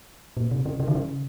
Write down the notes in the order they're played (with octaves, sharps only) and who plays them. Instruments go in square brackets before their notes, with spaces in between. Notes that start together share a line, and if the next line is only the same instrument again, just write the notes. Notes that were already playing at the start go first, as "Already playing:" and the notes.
[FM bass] A#2
C3
C#3
C#3
D#3
C#3